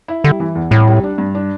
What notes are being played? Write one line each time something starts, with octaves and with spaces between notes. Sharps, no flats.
E4
D3 G3
E3
E2
C2 A2
G3
D4
G2
D4